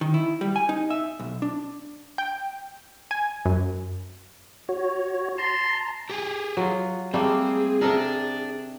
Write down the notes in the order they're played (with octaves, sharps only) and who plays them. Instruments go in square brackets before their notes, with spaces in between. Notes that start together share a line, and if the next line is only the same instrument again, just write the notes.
[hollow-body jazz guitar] D#3
E4
G3
G#5
D#4
E5
B1
D4
[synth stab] G5
G#5
F#2
[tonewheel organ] F#4 C#5
[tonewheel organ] A5 A#5 [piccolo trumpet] C6
[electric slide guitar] G4 G#4 G#5
[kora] F#3 F4
[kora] G3 A3 A#3 [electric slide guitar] C4 [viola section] G#4
[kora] C3 A4 A#4 [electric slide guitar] D4